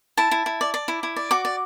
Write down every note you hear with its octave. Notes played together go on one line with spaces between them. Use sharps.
E4 A5
E4
E4
D5
D5
E4
E4
D5
F#4 D6
D5